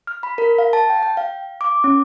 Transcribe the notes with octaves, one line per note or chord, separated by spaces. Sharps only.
F6
B5
A#4
F5
A5
G5
G5
F5
D6
C#4